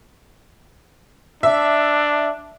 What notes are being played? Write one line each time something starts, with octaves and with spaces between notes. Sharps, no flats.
D4 E5